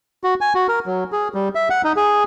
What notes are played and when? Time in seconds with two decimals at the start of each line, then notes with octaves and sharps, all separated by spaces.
0.24 F#4
0.41 G#5
0.55 F#4
0.68 A#4
0.86 F#3
1.12 G#4
1.34 G3
1.55 E5
1.70 F#5
1.84 D#4
1.96 G#4